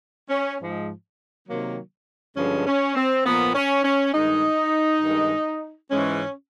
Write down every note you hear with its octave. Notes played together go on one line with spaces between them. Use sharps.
C#4
G#2 F3 G#3
C3 D#3 F#3 A#3
G2 D3 F3 G#3 C#4
C#4
C4
A#2 F3 A#3 B3
C#4
C#4
G2 D#3 G#3 D#4
G2 D#3 G#3
G#2 E3 G#3 C#4